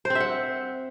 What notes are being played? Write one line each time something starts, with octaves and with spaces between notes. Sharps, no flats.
C5
C4
E5
F#5